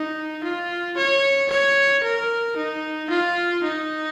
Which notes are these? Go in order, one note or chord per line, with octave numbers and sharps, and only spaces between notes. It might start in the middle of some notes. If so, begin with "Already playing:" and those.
Already playing: D#4
F4
C#5
C#5
A#4
D#4
F4
D#4